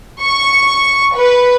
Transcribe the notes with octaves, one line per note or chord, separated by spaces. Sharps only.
C#6
B4